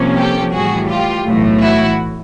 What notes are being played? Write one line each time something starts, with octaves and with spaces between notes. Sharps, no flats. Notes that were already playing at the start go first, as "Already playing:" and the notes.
Already playing: C2 C3 F3 A#3 C#4
G4 A4
A2 E3 G3 F#4 G#4
F4 G4
B1 A2 E3 A3
E4 F#4